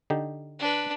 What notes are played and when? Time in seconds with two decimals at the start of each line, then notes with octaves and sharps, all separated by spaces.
0.10 D3 D#4 G4
0.59 D4 B4